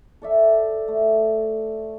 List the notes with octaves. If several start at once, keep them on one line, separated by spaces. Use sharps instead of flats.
A4 D5 E5
A3